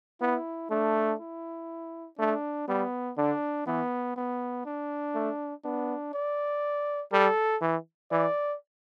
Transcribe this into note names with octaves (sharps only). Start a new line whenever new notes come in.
B3 E4
A3 D4
E4
A3 D4
G3 B3
D3 D4
E3 B3
B3
D4
A3
B3 D4
D5
G3 A4
E3
E3 D5